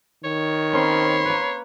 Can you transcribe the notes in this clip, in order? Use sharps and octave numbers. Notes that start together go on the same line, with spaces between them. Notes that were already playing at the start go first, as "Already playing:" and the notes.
D#3 C#5
A#3 C4 C#4 B5 C6
A#3 B4